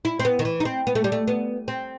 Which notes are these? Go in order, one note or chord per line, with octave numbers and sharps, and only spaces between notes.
E4
C4
B3
D#3
E3
D#4
C4
B3
A3
G3
A3
B3
C4